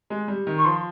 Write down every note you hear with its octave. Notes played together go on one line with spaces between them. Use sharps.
G#3
G3
D#3
C#6
F3 C6